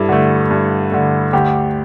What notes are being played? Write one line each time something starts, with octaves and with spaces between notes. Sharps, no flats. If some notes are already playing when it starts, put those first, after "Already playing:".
Already playing: G2 E4 A4
D3 A3
G2
D3 A3
D2 G4